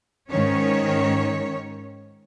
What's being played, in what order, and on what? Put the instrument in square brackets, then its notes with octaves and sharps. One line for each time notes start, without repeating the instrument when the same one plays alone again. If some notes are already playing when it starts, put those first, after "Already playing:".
[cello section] G#2 D#3 C#4 C#5